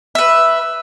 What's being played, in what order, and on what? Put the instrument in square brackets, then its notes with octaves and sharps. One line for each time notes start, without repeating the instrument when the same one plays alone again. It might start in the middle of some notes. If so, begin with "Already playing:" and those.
[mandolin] B4 E5